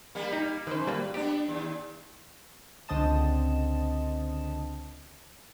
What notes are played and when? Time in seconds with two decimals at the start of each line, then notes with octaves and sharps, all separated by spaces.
0.15 G3 A#3
0.33 D#4
0.67 F#2 D#3 B4 C5
0.87 G3 A#3 B4
1.14 B3 D4 G4
1.48 D#2
2.88 C#2 D3 C4 D#5 A5 E7